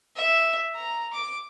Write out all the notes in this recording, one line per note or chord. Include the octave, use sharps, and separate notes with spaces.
E5
A#5
D6